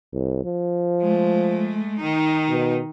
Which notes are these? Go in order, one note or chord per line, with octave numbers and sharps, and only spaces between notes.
C2
F3
G#3 A3
D#3 D#4
B2